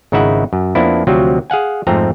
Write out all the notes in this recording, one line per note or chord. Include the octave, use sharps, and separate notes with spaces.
G#1 C#3 D#4 E4 E5 F#5
F#2
F2 F3 A#3 B3 D4 E4
D2 C3 F3 F#3 C4
G#4 F5 F#5 G#5
F2 G#2 F3 A3 C4 A#5